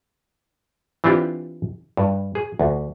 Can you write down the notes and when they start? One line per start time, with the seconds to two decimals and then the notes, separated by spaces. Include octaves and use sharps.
1.04 E3 C4 D4 E4 F4 G4
1.97 G2
2.35 G#4
2.59 D2